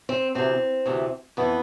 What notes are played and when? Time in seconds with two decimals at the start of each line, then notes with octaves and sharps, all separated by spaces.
0.09 C4
0.35 D2 C3 E3 C4
0.86 D2 C3 E3
1.37 F2 E3 B3